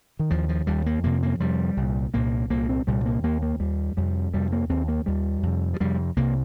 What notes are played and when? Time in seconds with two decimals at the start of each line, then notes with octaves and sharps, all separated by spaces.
0.19 D#3
0.30 D#2 F3
0.49 F3
0.67 D#2 G3
0.86 A#3
1.03 F2 C3 A#3
1.23 A#3
1.40 F2 C3 G3
1.77 C2
1.82 A#2
2.14 C2 A#2 A#3
2.50 C2 A#2 A#3
2.69 C4
2.87 C2 A#2 G3
3.05 A#3
3.23 D#2 A#3
3.42 A#3
3.60 D#2 G3
3.97 F2 C3 G3
4.34 F2 C3 G3
4.52 A#3
4.69 D#2 C4
4.88 A#3
5.06 D#2 G3
5.43 F2 C3
5.74 F3
5.80 F2 C3 G3
6.16 C2 C3 A#3